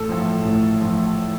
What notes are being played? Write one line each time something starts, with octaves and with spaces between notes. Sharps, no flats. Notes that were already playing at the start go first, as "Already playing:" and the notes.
Already playing: A1 A4
A2 F3
A1
A2 F3